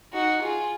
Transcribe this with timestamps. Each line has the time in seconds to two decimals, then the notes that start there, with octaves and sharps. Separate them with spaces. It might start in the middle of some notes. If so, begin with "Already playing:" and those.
0.14 D#4 F#4
0.43 F4 G#4